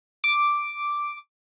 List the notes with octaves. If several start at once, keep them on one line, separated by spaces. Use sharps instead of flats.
D6